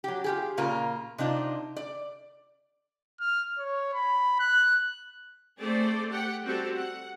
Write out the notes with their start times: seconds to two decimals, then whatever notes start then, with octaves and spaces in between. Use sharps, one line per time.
0.04 F#3 G4
0.24 F4 G4 G#4
0.57 A#2 C#3 A#3 F4 A#4
1.18 C3 D4 D#4 F4
1.76 D5
3.20 F6
3.58 C#5
3.93 B5
4.40 F#6
5.60 A3 C4 G#4 A4 C5 D5
6.11 G4 F#5 G5
6.44 G3 C4 F#4 G4 A4
6.74 F#5